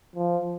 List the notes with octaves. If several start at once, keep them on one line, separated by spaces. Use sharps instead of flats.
F3